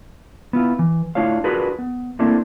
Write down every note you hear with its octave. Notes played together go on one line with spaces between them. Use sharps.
B3 E4 F4
E3
A3 D4 E4 F4 C#5 F5
D4 F4 F#4 G#4 A#4 B4
B3
A3 A#3 C4 D4 E4